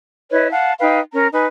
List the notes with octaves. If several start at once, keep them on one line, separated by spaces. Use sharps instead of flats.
E4 B4 C#5 D#5
F5 F#5 A5
D#4 B4 F5 G5
C#4 A#4 A#5
D#4 B4 G#5